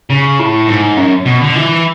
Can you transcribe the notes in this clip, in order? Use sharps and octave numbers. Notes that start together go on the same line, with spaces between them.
C#3
A2
G#2
F#2
B2
D3
E3